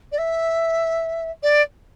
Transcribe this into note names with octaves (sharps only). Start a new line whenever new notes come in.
D5
E5
D5